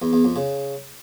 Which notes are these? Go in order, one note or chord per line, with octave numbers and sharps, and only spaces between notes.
E2
E2
F2
C#3